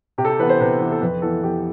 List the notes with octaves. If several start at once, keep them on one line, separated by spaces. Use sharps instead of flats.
C3 G4
A4
G4
E3 B3 B4
C5
C3 B4
E3 B3
A4
F2 B4
E3 B3 A4
F2 G4